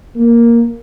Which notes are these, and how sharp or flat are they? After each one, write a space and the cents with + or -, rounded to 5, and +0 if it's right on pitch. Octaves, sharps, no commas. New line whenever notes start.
A#3 +5